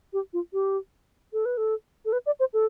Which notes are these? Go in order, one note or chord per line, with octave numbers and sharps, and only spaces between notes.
G4
F4
G4
A4
B4
A4
A4
B4
D5
C5
A4